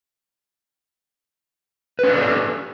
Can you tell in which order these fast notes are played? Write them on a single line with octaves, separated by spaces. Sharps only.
B4 C#4 D4 A4 G4